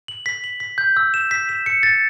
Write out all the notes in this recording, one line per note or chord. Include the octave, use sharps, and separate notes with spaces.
F#7
B6
F#7
B6
G6
E6
E7
B6
E7
C#7
A6